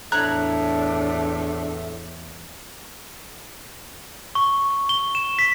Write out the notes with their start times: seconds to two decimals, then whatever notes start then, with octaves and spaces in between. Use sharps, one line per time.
0.12 E2 A2 D4 A#5 F#6 G#6
4.35 C#6
4.89 G7
5.15 E7
5.39 B6